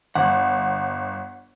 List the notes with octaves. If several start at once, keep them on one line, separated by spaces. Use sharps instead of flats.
G1 F#5